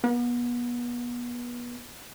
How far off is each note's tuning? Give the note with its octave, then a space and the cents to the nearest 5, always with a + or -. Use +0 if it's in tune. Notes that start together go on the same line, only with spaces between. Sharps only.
B3 -30